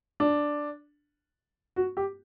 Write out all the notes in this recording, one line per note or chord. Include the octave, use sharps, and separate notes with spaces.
D4
F#4
G4